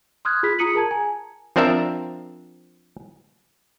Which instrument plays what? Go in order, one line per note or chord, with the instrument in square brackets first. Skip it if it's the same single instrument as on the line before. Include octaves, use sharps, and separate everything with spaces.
[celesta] C6 D#6 F6 F#6 G#6
F4 G#4 B5 B6
F4 A#5 D#6 C#7 D#7 F#7
G#4 A#4 A5 A#5 G#6
G#5
[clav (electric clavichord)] F3 C4 D4 A#4 E5